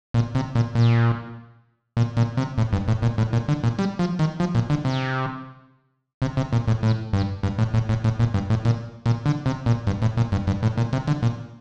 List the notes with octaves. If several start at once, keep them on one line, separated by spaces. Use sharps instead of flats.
A#2
C3
A#2
A#2
A#2
A#2
C3
A2
G2
A2
A#2
A2
A#2
D3
A#2
G3
F3
D#3
F3
A#2
D3
C3
C3
C3
A#2
A2
A2
G2
G2
A2
A2
A2
A2
A#2
G2
A2
A#2
A#2
D3
C3
A#2
G2
A2
A#2
G2
G2
A2
A#2
C3
D3
A#2